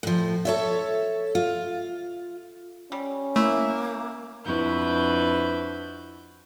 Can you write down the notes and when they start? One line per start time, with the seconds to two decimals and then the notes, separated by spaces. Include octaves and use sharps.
0.03 A2 F3
0.45 A4 C#5 E5
1.35 F4
2.92 G3 C#4
3.36 A3 A#3 E4
4.44 F2 D4 E4 F#4 B4 G6